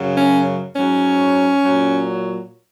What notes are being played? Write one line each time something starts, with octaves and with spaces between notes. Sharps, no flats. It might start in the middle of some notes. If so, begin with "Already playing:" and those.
Already playing: F#2 C#3 F#3
C#4
G#2 F#3 C#4
A#2 F#3